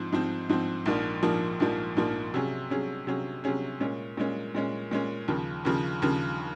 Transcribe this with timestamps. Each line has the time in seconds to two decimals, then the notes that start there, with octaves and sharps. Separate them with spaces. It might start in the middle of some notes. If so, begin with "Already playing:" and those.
Already playing: G#2 F3 C4
0.12 G#2 F3 C4
0.49 G#2 F3 C4
0.86 A#1 G#2 F3 A#3
1.23 A#1 G#2 F3 A#3
1.60 A#1 G#2 F3 A#3
1.97 A#1 G#2 F3 A#3
2.34 C3 F#3 C#4 G#4
2.70 C3 F#3 C#4 G#4
3.07 C3 F#3 C#4 G#4
3.44 C3 F#3 C#4 G#4
3.81 A#2 G#3 C#4
4.17 A#2 G#3 C#4
4.55 A#2 G#3 C#4
4.91 A#2 G#3 C#4
5.28 D#2 C#3 F3
5.65 D#2 C#3 F3
6.02 D#2 C#3 F3